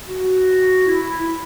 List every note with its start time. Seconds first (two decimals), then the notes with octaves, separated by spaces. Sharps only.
0.08 F#4
0.87 E4
1.19 E4